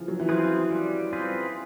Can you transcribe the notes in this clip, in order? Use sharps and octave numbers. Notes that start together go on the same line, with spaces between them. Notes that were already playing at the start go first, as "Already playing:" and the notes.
Already playing: C#3 E3 F3
F#3
E3
F3 C4 F4 G#4 B4
G3
C4 F4 G#4 B4